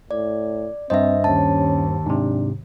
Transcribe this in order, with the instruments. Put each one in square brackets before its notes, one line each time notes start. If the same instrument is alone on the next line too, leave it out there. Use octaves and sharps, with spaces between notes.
[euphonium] A2 [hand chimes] D5
[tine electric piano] G2 C5 [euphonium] C4 [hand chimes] D#5 E5
[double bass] D#2 [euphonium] C#4 [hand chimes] A5
[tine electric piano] G#2 C3 [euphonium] D4